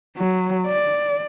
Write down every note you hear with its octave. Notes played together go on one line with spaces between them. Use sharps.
F#3
D5